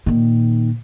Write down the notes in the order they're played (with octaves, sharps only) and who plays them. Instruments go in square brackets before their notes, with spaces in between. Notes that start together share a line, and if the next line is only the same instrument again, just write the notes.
[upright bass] A#2 D#3